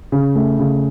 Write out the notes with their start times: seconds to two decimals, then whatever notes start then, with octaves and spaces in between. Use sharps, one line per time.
0.12 C#3
0.35 A3
0.59 C#3